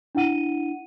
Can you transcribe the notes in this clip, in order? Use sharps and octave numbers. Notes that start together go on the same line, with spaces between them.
D4 E4 F#5 D#7